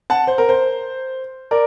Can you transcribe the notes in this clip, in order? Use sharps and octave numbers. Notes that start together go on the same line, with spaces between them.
F#5 A5
C5
A#4
C5
A#4 D5